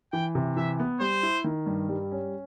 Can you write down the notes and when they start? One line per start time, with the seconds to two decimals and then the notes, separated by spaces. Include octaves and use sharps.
0.12 E3 G5
0.35 C3
0.57 E3 E5
0.79 B3
1.00 G3 C5
1.23 E4
1.44 D#3
1.66 G2
1.89 G3
2.11 C#4